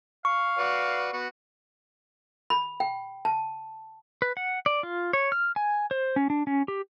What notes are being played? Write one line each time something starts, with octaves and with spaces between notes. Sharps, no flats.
F5 C#6
F#4 B4 D5
B3 F#4
B5
G5
A5
B4
F#5
D5
F4
C#5
F6
G#5
C5
C#4
D4
C#4
G4